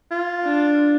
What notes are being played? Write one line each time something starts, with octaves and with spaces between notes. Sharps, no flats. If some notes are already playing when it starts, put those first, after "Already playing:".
F4
D4